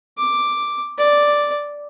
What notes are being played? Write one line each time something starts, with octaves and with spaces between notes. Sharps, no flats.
D6
D5